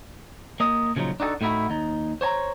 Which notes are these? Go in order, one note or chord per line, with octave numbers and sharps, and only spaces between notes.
A#3 D#5
A#2 C#3 F3 F#3 D#4
D4 D#4 F#4 G#4 A4
A2 A3 D#4 E4 F#4
D#2 D#4
C5 C#5 A5 A#5